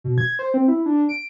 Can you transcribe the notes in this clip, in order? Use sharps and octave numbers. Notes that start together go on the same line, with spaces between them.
B2
G#6
C5
C4
E4
D4
D7